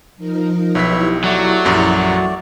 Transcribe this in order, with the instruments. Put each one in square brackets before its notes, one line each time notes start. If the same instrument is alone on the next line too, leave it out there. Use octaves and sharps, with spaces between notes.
[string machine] F3 D#4 A#4
[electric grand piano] B1 B6 [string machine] E4 G4 [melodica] B4 C#5 E5
[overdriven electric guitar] F#3 [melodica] A3 F#4 D5
[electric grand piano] A#1 F#2